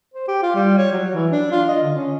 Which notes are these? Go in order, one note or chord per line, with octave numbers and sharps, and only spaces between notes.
C5
G4
F4
G3
C#5
F#3
E3
D4
F4
D#5
D3
C#4